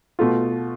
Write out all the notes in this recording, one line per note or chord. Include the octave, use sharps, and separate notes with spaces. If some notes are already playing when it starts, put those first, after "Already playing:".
B2 A3 F4